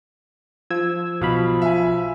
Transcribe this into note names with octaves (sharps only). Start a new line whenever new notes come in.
F3 E6 G#6
B1 B2 F3 F5 B5
E5 G#5